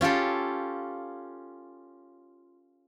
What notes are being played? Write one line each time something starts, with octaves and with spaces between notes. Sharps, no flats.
C#4 F4 G4 A4